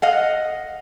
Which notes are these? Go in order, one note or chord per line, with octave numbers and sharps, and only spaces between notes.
D#5 F5 F#5